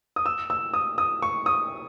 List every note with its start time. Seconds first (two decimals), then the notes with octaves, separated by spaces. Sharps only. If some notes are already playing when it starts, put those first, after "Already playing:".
0.16 D#6
0.26 E6
0.50 E6
0.74 D#6
0.98 D#6
1.22 C#6
1.46 D#6